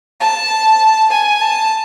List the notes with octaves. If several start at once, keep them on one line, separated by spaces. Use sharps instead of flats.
A5
G#5
A5